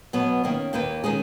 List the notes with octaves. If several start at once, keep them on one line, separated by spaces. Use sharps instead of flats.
B2 F#3 B3
D#3 A#3 C#4
D#2 D#3 A#3 F4 B4
D#3 G#3 C#4 G#4